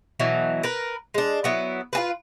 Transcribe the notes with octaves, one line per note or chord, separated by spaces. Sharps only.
B2 E3 F#3
A#4 B4
G#3 D4
F#3 B3 E4
F4 G#4 B4